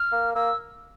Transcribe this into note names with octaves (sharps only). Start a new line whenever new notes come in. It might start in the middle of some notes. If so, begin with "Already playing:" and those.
Already playing: F6
A#3
A#3 E6